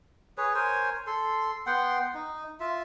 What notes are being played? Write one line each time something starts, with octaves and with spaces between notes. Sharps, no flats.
G#4 B4 C#5
A#4 C5 C#5 G#5
A4 C6
B3 F#5 G5 C6
D#4
F4 E5